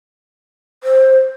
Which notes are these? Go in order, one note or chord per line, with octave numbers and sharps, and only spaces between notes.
C5